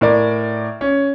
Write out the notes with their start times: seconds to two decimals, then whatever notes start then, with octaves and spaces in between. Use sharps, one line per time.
0.01 A2 A#4 D5
0.81 C#4